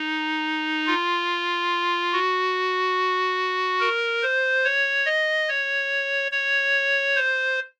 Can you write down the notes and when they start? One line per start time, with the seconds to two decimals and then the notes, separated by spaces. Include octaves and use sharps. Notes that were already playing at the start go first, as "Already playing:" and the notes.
Already playing: D#4
0.87 F4
2.13 F#4
3.80 A#4
4.23 C5
4.64 C#5
5.06 D#5
5.48 C#5
6.31 C#5
7.16 C5